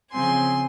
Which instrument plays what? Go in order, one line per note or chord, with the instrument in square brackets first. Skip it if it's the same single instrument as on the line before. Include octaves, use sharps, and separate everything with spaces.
[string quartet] C#3 F3 C4 G#5 C6